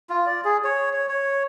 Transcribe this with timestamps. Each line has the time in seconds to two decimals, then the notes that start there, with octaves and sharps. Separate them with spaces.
0.10 F4
0.26 D5
0.45 G#4
0.64 C#5
0.93 C#5
1.09 C#5